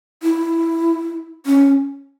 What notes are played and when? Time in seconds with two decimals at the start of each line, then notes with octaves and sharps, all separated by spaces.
0.23 E4
1.46 C#4